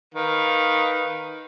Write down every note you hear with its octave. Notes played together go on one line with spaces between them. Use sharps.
D#3 B4 F5